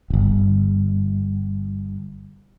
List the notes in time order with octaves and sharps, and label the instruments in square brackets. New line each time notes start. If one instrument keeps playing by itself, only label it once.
[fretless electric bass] D1 G1